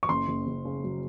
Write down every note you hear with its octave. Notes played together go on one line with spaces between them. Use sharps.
C#6
F#1 C6
F#1
F#1
C#3
F#3